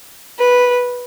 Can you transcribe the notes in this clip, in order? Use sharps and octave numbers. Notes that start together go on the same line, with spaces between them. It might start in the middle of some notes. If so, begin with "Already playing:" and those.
B4